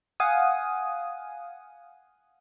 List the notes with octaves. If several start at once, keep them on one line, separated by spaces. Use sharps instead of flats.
F5 F#5 G#5 D#6